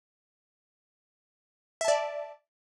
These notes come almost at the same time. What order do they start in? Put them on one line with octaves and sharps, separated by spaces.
E5 A5 D5